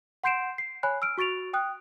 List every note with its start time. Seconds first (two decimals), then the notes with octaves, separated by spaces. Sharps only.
0.24 F#5 C6 G6 C7 D7 E7
0.58 C7
0.83 C#5 G#5 B5 F#6
1.02 E6 F6 D7
1.18 F#4 C#6 A6 D7 F7
1.53 G5 D#6 F#6